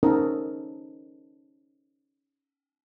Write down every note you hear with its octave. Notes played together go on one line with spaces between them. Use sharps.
C#4 D#4 A4 A#4 C5 D#5